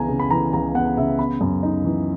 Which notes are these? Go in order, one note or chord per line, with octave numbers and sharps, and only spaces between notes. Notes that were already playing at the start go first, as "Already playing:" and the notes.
Already playing: C#2 E3 B3 G#5 A#5
C#3
B5
E3 A#5
C#2 A#5
B3 F#5
C#3 E5
B3 B5
F#2
D#4
E3